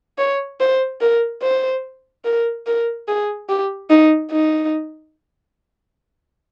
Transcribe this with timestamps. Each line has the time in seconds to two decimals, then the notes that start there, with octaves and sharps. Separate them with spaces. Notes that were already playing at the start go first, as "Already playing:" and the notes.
0.18 C#5
0.60 C5
1.01 A#4
1.42 C5
2.25 A#4
2.67 A#4
3.08 G#4
3.49 G4
3.90 D#4
4.31 D#4